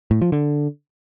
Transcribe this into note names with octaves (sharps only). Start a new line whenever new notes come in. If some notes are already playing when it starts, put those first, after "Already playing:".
A2
F3
D3